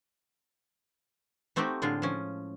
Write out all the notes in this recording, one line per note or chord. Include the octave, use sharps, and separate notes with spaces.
A3 C4 D#4 F#4 G4
A2 D3 G#3 F4
F3 C#4